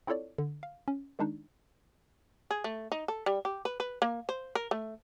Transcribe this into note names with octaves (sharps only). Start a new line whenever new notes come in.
C4 E4 F4 A4 C#5 D5
D3
F5
C#4
D#3 G#3 D4 D#4
G#4
A3
D#4
A4
G3
G4
B4
B4
A#3
C5
A#4
A3